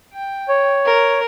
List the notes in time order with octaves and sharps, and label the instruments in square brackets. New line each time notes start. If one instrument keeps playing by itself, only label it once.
[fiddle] G5
[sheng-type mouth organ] C#5
[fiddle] A#4